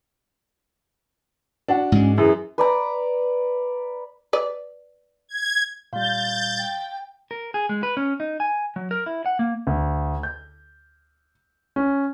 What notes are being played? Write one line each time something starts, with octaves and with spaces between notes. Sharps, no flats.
D4 F#4 F#5
G#2 G#3 C#4
F#2 E3 G#4
B4 D5 A#5
B4 D5
G#6
A#2 G3 F5 C6 G6 A6
G5
A#4
G#4
G#3
B4
C#4
D#4
G#5
F#3
A#4
E4
F#5
A#3
D2
G6
C#4